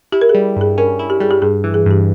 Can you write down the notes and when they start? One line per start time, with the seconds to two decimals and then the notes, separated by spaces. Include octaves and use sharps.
0.12 E4 G4
0.21 A#4
0.29 G#4
0.34 G3
0.56 G2 G#4
0.78 C#4 A#4
0.99 E4
1.10 G4
1.20 G3 G#4
1.31 G4
1.42 G2 G#4
1.64 E3
1.74 G#4
1.86 G2 G4